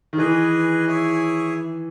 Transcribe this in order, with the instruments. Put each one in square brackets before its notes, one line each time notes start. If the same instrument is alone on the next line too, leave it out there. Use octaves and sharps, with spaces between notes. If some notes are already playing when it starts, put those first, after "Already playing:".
[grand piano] D#3
[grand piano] E3 [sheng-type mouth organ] G#4 B4 D#5 G#5
[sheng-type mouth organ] E4 G#4 C#5 E5 G#5